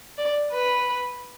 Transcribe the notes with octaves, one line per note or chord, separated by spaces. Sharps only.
D5
B4